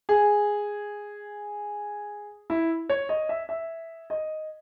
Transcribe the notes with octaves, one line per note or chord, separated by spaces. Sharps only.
G#4
E4
C#5
D#5
E5
E5
D#5